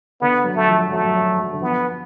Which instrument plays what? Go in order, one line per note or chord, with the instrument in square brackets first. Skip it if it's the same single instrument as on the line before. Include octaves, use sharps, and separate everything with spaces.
[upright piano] D3 [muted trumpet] B3
[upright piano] F#3
[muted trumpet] A3
[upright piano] F3
[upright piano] F#3 [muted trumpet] A3
[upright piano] F#3
F#3
D3
[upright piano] F3 [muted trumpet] B3